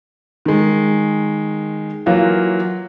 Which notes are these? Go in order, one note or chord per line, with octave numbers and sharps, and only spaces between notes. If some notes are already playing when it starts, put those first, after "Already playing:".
D#3 G#3
E3 F#3 A#3 F4